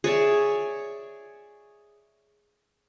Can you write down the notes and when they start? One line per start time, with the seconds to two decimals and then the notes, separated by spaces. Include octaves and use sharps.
0.04 G#4 C#5 D5 E5